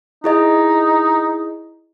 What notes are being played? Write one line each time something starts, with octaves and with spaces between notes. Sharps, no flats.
D#4 E4 G#4 D#5